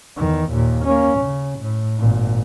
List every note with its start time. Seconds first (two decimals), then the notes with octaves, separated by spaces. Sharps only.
0.17 E2 D#3
0.51 D#2 A#2
0.86 A#3 C#4
1.19 C#3
1.59 A2
1.98 G#1 A#2